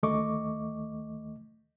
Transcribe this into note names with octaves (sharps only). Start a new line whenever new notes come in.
D2 D#3 A3 D#5 C#6 D6